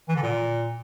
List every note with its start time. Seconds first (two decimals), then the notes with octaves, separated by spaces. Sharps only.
0.09 E3
0.16 D3
0.23 A#2